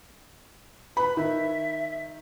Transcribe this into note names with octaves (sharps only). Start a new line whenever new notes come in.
B4 B5
D#3 E5